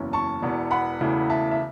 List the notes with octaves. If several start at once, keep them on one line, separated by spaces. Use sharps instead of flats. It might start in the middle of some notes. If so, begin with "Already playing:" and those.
Already playing: F#1 E2 E3 C#4
A5 C#6
E1 E2 E3 B3
F#5 B5
E1 E2 C#3 E3 A3
E5 A5
E5